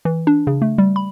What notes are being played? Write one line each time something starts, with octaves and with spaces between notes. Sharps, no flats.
E3
D4
C#3
A3
G3
B5